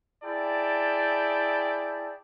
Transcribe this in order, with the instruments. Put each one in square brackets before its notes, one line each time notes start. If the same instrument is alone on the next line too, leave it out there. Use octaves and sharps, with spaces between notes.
[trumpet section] E4 G#4 D5 G5 A5